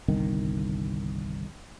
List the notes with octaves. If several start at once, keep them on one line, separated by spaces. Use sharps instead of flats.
G1 C2 D#3